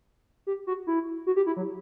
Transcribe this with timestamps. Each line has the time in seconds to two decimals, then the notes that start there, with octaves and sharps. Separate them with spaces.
0.47 G4
0.67 F#4
0.87 E4
1.27 F#4
1.36 G4
1.46 E4
1.57 F#3